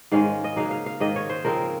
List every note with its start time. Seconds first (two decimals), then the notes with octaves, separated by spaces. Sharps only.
0.12 G#2 D#3 G#3 C#4 F5
0.44 D#5
0.56 C#3 F#3 A#3 D#4 F5
0.71 F5
0.86 F5
1.00 G#2 D#3 A#3 D#5
1.16 C#5
1.30 C5
1.45 C#3 F3 C4 D#4 A#4